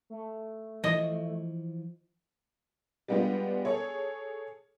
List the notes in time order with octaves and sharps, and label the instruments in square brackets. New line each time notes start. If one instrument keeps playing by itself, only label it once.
[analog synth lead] A3
[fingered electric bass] E3 F3 [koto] D#5
[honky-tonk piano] G3 G#3 B3 D4 F4 G4
G#4 A4 C#5